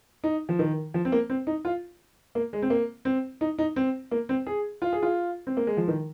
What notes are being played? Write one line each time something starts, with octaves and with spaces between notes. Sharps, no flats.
D#4
F3
D#3
F3
C4
A#3
C4
D#4
F4
A#3
G#3
C4
A#3
C4
D#4
D#4
C4
A#3
C4
G#4
F4
G#4
F4
C4
A#3
G#3
F3
D#3